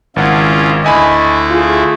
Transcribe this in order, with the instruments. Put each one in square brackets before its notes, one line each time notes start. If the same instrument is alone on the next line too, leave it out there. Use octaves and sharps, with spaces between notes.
[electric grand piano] G#1 F#5 [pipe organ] C#3 E4 F4
[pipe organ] D2 A3 E4 [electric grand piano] D#5 G#5 B5
[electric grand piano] F4 G#4